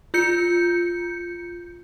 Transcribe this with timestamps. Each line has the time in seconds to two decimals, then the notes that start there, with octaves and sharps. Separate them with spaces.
0.14 F4 G6 C#7